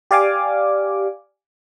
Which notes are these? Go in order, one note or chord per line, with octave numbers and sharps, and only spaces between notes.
G4 D5 F5 G#5 D6